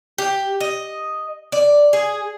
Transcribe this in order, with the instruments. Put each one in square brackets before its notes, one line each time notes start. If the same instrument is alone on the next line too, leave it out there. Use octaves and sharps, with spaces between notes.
[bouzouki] G4
D#5
D5
G#4